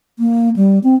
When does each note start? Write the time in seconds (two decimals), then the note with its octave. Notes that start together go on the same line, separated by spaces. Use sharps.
0.19 A#3
0.56 G3
0.84 C4